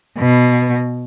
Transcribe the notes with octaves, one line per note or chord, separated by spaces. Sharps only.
B2